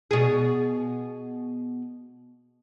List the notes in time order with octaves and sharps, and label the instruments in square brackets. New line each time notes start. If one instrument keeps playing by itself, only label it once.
[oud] B2 G#4